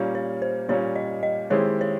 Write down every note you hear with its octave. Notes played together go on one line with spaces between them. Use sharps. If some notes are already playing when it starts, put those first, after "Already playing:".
Already playing: A#2 G3 A#3 C#4
C#5
C5
A#2 G3 A#3 C#4 C#5
D#5
D#5
D#3 G#3 C4 E4 G4 C#5
C#5